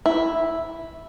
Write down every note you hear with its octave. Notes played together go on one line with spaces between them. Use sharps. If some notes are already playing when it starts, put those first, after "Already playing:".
E4